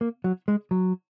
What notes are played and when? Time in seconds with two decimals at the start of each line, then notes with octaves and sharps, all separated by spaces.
0.01 A#3
0.24 F#3
0.48 G#3
0.71 F#3